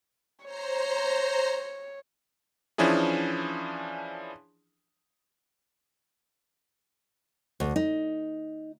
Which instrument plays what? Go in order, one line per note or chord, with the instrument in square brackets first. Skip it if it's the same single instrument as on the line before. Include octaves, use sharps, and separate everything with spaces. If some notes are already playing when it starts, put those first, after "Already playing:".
[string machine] C5 A#5 C7 [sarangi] C#5
[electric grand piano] E3 F3 C#4 D4 E4 G#4
[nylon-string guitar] D2
D#4